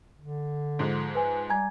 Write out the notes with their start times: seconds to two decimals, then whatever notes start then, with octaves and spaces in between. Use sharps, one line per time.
0.19 D3
0.79 G#2 F3 G#3
1.15 B4 G#5
1.50 G3 G#5 A#5 G#6